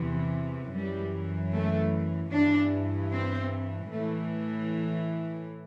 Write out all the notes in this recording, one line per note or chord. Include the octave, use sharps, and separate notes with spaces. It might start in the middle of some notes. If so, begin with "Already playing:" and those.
Already playing: E2 C3 E3
F#2 E3 G3
A3
G2 E3 D4
C4
A2 E3 A3